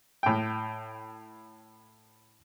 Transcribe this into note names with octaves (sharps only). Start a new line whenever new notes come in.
A2 G5